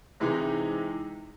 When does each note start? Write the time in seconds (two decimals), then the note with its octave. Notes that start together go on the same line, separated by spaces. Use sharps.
0.20 C3 E3 G#3 D#4